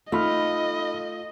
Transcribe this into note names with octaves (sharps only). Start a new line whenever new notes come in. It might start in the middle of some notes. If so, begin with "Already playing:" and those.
A3 D#4 F4 D#5 B5 F6